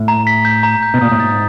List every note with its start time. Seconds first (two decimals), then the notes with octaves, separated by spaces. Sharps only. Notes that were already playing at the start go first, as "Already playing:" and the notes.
Already playing: A2
0.08 A#5
0.27 B6
0.45 G6
0.63 A#5
0.83 G6
0.94 B2
1.01 A#2 D#6
1.12 A2
1.20 G#2 A6